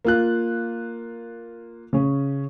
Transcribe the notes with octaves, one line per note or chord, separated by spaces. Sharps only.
A#3 F4 F#6
C#3 C#4